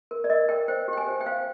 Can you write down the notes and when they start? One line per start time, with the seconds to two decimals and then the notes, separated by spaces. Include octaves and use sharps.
0.11 A#4
0.24 D5
0.30 A#4 D#5
0.49 A#4 G5
0.68 C5 G5
0.88 G4 G5
0.97 G#5
1.07 C5
1.21 G5
1.26 C5 F5